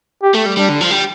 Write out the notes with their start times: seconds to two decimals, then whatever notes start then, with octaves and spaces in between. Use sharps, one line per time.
0.23 G4
0.35 A3
0.46 G3
0.57 G3 D4
0.69 D3
0.81 F3
0.91 G3